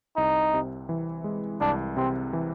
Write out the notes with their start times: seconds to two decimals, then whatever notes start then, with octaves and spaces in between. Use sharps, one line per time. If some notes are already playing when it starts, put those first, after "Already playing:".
0.17 C2 D#4
0.54 C3
0.89 E3
1.24 G#3
1.61 C2 D4
1.97 C3 C4
2.33 E3